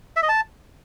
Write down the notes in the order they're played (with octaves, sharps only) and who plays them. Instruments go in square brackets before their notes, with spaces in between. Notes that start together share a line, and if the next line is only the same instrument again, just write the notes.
[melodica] E5
D#5
A5